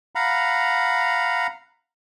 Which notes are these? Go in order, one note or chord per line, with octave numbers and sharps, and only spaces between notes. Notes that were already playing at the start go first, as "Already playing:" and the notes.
F5 F#5 A#5 B5